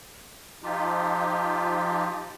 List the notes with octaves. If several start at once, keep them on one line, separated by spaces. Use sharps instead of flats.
F3 D#4 F4 G4